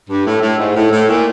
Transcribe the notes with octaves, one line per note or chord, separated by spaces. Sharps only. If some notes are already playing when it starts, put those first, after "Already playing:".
G2
A2
A2
G#2
A2
A2
A#2